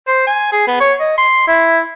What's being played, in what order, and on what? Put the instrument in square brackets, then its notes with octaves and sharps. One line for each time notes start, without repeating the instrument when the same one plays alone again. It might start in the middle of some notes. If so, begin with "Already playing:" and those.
[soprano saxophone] C5
G#5
G#4
B3
C#5
D#5
C6
E4